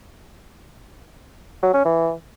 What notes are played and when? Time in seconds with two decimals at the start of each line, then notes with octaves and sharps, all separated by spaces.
1.63 F#3
1.74 C#4
1.85 E3